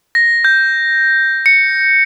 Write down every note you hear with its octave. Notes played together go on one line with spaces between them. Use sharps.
A#6
G6
C#7